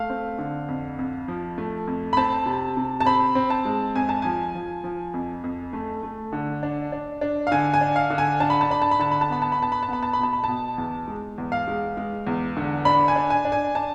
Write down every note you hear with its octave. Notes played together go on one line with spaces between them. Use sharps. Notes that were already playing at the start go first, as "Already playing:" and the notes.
Already playing: A3 F5
C4
D3
F2
F2
F3
A3
F2
B5
C4 A5
C3
C3
A5
C4 B5
C4
A5
G#3
F2 G#5
A5
F3 G#5
F3
F3
F2
F2
A3
A3
D3
D4
D4
D4
F5
D3 G#5
G#5
D4
F5
D3
G#5
D4 A5
B5
A5
D4 B5
A5
B5
D3 A5
B5
A5
B3 B5
A5
B5
B3 A5
B5
A5
B3 B5
A5
B5
B2 A5
B5
B2 A5
E2
G#3
E2
F5
G#3
G#3
E2
D3
D4 B5
G#5
D4
G#5
D4
G#5
D4 A5